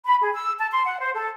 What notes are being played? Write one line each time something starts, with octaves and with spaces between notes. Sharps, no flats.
B5
G#4
E6
A5
C6
F#5
C5
A4